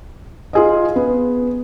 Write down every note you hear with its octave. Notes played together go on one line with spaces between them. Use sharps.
F4 G#4 D#5
B3